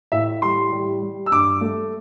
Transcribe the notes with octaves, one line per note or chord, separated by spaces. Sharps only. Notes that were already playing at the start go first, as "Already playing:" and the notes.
A2 E5
G3 C6
G3
G3
E6
G2 D6
A3